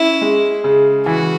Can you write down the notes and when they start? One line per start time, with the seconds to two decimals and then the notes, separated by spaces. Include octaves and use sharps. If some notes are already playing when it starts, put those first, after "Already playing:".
Already playing: C#4 E4
0.22 G#3
0.64 C#3
1.06 E3 F#4